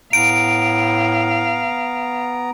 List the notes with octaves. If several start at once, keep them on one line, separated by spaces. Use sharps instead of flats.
A2 B3 F5 A#5 D7